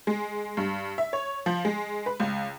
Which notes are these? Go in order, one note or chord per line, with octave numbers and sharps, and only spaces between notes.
G#3
G2
E5
C#5
F3
G#3
B4
C#2